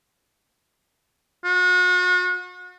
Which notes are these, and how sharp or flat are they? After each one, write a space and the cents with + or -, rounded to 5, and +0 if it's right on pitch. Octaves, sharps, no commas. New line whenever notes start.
F#4 -40